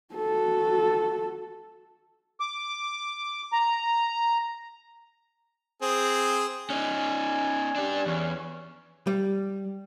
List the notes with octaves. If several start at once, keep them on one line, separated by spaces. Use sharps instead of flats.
F#4 A4
D6
A#5
C4 G#4
C#4 D#4 G#5
D4 G4
E2 C#4
G3